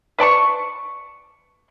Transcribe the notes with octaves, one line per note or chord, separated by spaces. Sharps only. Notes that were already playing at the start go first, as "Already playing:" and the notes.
B4 D5 A5 C#6